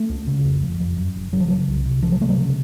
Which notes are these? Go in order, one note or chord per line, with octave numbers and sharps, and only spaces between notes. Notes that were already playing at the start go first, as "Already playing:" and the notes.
Already playing: A3
C#2
C#3
F1
F2
F2
F#2
F#1
F#1 F#3
F3
C#3 F#3
C2
C3
C3 F3
F#3
C3 A3
F#3
C#3